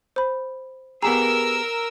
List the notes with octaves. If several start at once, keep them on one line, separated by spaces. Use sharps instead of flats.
C5 B5
B3 G4 G#4 A#4 A#5 E6